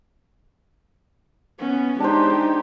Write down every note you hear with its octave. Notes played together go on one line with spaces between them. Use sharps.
B3 C#4
G#3 D4 D#4 G4 C5